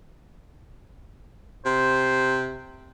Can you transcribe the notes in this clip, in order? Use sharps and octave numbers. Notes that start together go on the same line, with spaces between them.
C3 C5